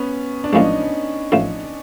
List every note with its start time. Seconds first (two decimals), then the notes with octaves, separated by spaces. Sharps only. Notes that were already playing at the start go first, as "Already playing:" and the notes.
Already playing: B3 C#4
0.44 D4
0.53 A1 A2 F3 G#3 C#4 D#4
1.32 A1 A2 F3 A3